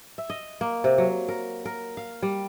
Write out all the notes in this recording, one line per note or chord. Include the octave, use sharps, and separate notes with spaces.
E5
D#5
A#3
C3
F#3
A#4
A#4
F5
G3